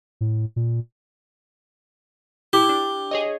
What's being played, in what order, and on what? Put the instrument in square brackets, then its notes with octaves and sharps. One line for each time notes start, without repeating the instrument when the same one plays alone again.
[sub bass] A2
A#2
[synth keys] E4 [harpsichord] G4
[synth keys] D4
G#4 C#5 D#5